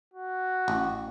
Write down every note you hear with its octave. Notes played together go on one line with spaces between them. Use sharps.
F#4
A1